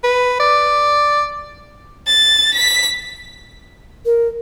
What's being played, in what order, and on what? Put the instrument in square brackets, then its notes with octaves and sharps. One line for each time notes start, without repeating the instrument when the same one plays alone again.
[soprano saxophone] B4
D5
[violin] A6
B6
[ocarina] A#4